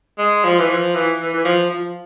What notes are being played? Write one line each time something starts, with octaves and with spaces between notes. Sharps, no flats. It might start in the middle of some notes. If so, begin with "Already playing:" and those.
G#3
F3
E3
F3
E3
E3
E3
F3
F3